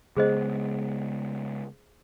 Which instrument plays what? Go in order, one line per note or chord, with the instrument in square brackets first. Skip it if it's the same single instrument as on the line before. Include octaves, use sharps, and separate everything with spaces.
[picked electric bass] C#3 G#3 B3 [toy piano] G#4 C5 D#5